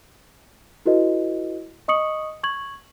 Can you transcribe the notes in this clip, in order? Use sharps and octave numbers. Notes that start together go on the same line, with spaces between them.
E4 F#4 A4 B4 D#5
D#5 C#6 D#6 C#7 F#7
C#6 G#6 F#7